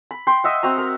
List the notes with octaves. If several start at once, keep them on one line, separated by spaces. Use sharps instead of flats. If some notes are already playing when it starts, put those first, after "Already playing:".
B5
G5 C6
D#5 E5 F#5
C4 F#4 A#5
A#4